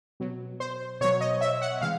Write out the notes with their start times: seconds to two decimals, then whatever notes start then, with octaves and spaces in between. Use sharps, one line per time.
0.20 B2 F#3
0.60 C5
1.01 B2 F#3 C#5
1.21 D#5
1.41 E5
1.62 F#5
1.81 C3 E3 G#3 F5